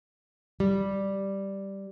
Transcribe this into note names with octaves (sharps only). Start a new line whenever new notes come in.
G3